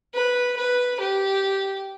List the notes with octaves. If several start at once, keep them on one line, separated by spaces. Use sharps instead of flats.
B4
B4
G4